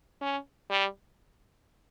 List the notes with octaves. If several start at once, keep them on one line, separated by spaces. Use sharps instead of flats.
C#4
G3